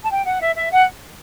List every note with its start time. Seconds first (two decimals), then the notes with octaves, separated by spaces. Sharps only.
0.03 A5
0.10 G5
0.26 F#5
0.41 E5
0.55 E5
0.72 F#5